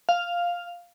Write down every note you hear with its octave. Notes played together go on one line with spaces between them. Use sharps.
F5